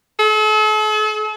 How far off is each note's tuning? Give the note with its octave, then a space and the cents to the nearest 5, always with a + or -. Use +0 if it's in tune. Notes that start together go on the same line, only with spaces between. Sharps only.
A4 -45